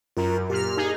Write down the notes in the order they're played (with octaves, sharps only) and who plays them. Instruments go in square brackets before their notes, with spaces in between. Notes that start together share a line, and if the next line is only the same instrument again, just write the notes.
[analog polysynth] F#2 [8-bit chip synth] F4 A#4 A#5
[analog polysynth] A#2 F6 [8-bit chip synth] G4
[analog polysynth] D#4 G#4